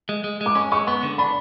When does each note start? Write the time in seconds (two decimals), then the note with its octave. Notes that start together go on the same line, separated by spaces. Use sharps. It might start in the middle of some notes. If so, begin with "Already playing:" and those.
0.09 G#3
0.24 G#3
0.41 G#3
0.46 D6
0.55 C#4 C#6
0.72 G#3 C#6
0.87 B3 C#6
1.03 D3
1.18 D4 B5